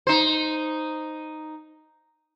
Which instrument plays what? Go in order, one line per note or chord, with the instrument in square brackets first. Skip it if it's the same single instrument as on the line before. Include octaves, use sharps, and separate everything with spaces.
[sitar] D#4 C5